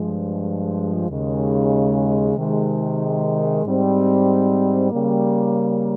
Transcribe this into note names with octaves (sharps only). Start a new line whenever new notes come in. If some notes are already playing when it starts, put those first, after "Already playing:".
Already playing: G2 F3 G#3
D#2 C#3 G#3
C3 D#3 G#3
G#2 G3 C4
C#3 G3 A#3